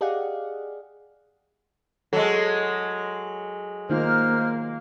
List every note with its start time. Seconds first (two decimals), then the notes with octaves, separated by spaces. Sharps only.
0.01 G4 G#4 D5 D#5 F5 F#5
2.13 F#3 G#3 A4
3.89 D#3 A#3 D#4 F4 C5 F6